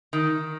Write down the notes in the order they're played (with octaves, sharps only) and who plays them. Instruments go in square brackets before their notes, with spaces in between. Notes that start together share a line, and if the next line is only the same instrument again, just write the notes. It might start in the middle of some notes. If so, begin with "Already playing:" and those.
[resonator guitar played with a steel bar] D#3